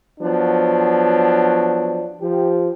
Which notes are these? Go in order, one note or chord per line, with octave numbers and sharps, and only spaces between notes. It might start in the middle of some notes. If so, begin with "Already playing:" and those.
F3 F#3 B3 D4
F3 G4